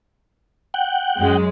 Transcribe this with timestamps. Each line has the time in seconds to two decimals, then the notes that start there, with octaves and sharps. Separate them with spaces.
0.74 F#5 G5
1.19 F#2 G#3